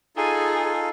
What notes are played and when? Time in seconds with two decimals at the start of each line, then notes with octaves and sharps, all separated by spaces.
0.17 D#4 F4 G#4 A4